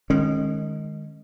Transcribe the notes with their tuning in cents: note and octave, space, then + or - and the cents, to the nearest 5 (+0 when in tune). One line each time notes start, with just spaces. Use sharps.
D#3 -20 G#3 +0 C#4 -25